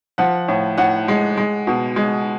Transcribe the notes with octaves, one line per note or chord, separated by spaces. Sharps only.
F3 F#5
A2
A2 F#5
G#3
G#3
B2
G#3